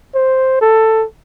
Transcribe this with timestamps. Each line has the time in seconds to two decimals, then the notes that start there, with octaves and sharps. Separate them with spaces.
0.15 C5
0.61 A4